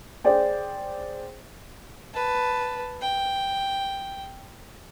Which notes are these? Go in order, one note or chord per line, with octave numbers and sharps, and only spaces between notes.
G#4 C5 D5 G5
B4 A5
G5